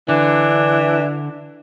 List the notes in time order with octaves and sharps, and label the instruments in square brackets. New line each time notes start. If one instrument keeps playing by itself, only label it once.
[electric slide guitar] D3 [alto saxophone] E3 [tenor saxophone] D4